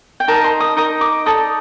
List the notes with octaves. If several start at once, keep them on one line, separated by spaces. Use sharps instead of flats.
G5
D#4 A#4 D#5 A5
C6
D#6
D#4 A#4 D#5 D#6
D6
D#4 A4 D5 D#6